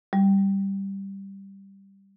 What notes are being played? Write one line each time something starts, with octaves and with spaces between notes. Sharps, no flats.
G3